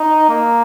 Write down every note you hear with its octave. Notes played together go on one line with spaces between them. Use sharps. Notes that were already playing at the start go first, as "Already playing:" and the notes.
Already playing: D#4
A#3